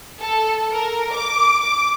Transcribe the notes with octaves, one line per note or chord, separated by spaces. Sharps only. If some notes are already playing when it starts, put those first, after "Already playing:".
A4
A#4
D6
D6